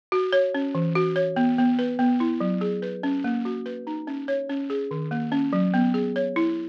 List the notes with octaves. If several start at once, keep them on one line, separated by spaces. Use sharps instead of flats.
F#4
C#5
C#4
E3
F#4
C#5
B3
B3
B4
B3
E4
F#3
G#4
B4
C#4
A#3
F#4
B4
D#4
C#4
C#5
C#4
G#4
D#3
A#3
C#4
F#3
B3
G#4
C#5
E4